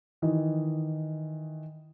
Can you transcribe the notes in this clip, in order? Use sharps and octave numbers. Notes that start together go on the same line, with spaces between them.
D#3 E3 D#5